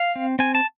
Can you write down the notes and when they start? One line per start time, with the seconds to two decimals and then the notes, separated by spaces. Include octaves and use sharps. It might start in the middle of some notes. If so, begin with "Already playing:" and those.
Already playing: F5
0.16 C4
0.39 C4 G#5
0.55 A5